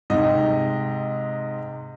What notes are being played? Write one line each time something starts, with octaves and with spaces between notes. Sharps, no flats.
G#2 C3 D#5